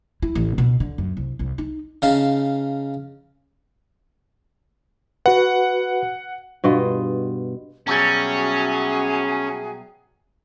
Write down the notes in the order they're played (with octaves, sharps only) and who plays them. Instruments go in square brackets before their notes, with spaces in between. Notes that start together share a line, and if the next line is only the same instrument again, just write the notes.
[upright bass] E4
A1
B2
D3
F#2
C2
C2
D#4
[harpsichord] C#3 D#4 F5 A5
[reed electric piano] F#4 B4 [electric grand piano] F#5
[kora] G2 B2 F4 D#5
[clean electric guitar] B2 F#3 G3 [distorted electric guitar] C#4 [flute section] F#4 G#4 E5